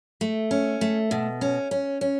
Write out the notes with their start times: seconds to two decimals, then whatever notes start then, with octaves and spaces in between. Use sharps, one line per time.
0.21 A3
0.51 C#4
0.81 A3
1.11 B2
1.41 C#4
1.71 C#4
2.01 C#4